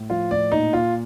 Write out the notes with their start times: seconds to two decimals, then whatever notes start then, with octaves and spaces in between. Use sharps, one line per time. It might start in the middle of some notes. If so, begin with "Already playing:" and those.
Already playing: A2
0.10 F3 F4
0.31 A2 D5
0.52 A#2 D#4
0.73 A#2 F4